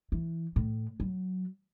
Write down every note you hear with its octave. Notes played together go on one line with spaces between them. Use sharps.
E3
A2
F#3